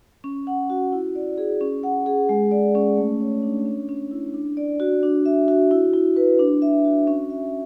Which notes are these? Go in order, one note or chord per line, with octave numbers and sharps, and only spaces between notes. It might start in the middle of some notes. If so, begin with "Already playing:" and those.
C#4
F#5
F#4
E4
D5
G#4
C#4
F#5
G#4
G#3
D5
C#4
A3
C#5
D4
C#4
C#4
E4
D4
D5
F#4
D4
E5
F#4
E4
E4
B4
D4
E5
F#4
C#4
E5